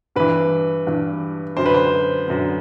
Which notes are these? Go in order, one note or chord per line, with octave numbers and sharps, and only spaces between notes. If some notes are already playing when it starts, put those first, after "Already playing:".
G2 E3 B4
G2 E3
F#2 D3 C5
B4
C5
F#2 D3